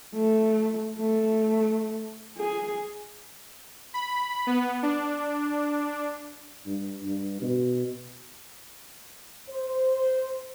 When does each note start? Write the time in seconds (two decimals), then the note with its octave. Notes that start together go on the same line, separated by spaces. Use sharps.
0.15 A3
0.99 A3
2.38 G#4
3.94 B5
4.47 B3
4.83 D4
6.66 G2
7.04 G2
7.42 B2
9.50 C5